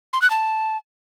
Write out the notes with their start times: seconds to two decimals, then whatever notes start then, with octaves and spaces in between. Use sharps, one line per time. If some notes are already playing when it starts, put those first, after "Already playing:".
0.13 C6
0.22 F#6
0.30 A5